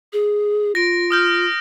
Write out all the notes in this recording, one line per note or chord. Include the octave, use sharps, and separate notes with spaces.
G#4
F4 A#6 D7
D#6 F6 G6